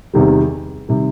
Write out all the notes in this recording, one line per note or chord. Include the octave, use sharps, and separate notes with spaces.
E2 C3 D#3 G3
C3 D#3 G3